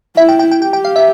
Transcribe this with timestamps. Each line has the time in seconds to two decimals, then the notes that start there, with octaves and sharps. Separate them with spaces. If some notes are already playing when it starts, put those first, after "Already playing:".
0.17 E4 E5
0.29 G5
0.39 G5
0.51 G5
0.62 G4 G5
0.73 G5
0.85 F5
0.96 E5